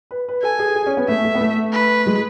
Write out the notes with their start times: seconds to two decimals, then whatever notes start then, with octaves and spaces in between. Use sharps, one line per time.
0.11 B4
0.29 B4
0.43 A4 G#5
0.59 G#4
0.75 G#4
0.86 C#4
0.97 B3
1.08 A3 E5
1.25 A3
1.35 B3
1.41 A3
1.73 B4
2.06 G#3